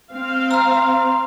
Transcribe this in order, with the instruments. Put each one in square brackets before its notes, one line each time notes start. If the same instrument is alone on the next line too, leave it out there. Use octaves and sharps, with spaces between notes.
[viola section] C4 F5
[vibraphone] A#5 C6